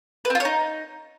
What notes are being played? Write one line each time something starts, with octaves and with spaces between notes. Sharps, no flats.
B4
C4
F4
C#5
D#4